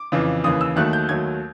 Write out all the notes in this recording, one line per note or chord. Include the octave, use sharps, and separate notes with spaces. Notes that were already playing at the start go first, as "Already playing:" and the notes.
Already playing: D6
F2 C#3 E3
D#2 C#3 E3 D#6
E6
D#2 D#3 F#3 A3 F#6
G6
D#2 D#3 F#3 A3 G#6